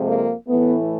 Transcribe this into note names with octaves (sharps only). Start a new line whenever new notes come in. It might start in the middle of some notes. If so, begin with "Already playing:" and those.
Already playing: F2 C3 F3 G#3
A#3
A2 E3 A3 B3